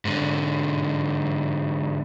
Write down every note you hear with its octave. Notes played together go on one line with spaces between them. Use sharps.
G#2 D3